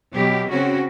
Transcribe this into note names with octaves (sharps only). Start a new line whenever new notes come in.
B2 F#3 G4
C#3 C4 C#4 F#4